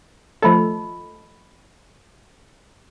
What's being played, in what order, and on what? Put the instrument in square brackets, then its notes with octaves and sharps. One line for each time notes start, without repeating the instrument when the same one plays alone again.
[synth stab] F3 A3 A4 [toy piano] D#5 B5